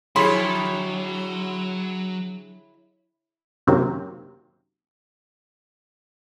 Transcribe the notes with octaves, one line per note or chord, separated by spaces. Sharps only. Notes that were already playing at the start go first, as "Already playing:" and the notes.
D3 F#3 E4 G4 G#4 C#5 C6
F#2 C3 D#3 F#3 A#3